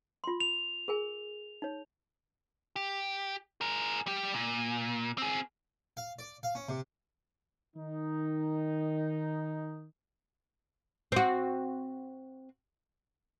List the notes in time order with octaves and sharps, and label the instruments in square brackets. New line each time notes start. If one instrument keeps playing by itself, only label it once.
[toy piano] F4 C6
[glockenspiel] F7
[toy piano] G#4 A#4 G#5
D#4 C#5
[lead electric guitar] G4
G#4 A#4
G3 G4
A#2
C4 G#4
[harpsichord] F5
D5
F5
C#4
C3
[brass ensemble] D#3 D#4
[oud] C4 F#4